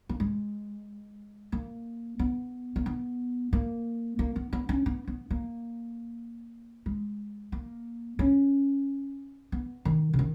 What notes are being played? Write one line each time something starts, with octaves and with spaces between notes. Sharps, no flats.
A#3
G#3
A#3
B3
A#3
B3
A#3
A#3
B3
B3
C#4
B3
B3
A#3
G#3
A#3
C#4
B3
D#3
C#3
D#3